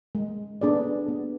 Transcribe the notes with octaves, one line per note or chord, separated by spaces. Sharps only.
G#3
B3 D4 G#4 D5
B3